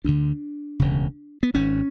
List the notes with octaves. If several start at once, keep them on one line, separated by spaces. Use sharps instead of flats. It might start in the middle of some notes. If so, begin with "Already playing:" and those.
D2 D3 D4
E1 D2 C#3
B3
G#1 G#2 C#4